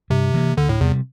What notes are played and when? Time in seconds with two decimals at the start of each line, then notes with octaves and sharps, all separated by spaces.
0.10 G2 C3
0.34 E3 A#3
0.57 D2 D3
0.69 A2
0.81 E2 C3 G3